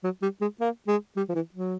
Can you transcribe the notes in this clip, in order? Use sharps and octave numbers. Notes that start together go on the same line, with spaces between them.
F#3
G3
G#3
A#3
G#3
G3
F3
E3
F#3